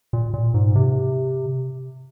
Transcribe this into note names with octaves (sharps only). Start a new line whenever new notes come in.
A#2
A#2
G#2
C3